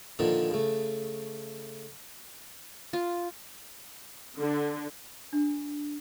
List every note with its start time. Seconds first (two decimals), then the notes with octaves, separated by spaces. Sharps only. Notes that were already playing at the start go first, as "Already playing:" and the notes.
0.19 A#2 D3 D#3 F3 F4
0.51 C#3 A3
2.93 F4
4.37 D3
5.33 D4